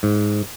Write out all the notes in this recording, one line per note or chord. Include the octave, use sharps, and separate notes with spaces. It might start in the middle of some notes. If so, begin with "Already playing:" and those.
G#2